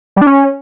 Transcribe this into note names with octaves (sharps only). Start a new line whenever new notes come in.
G3
D4
C#4